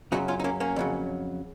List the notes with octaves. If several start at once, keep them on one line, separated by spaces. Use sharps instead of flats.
F#2 C#3 F#3 D#4 F#4
C#4 F4
D#4
A#3 C#4
A#3 C#4
F2 C#3 F#3